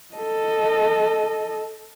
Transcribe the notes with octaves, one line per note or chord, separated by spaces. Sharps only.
A4 D#5